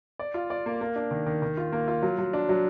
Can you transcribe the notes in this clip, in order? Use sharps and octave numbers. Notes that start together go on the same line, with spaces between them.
D5
F4
D5
A#3
A#3
D4
D#3
D#3
D#3
F4
A#3
F4
F#3
F#3
D4
F#3